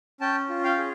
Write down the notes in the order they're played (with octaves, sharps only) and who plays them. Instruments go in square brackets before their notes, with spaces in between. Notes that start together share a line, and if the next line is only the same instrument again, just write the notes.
[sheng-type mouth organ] C#4 G5 A5
F4
F5 G5
G#4